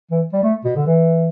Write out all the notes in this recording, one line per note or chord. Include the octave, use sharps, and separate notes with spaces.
E3
G3
A3
B2
D3
E3